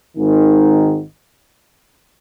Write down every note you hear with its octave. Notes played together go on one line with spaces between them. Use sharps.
G#1 G#2 D#3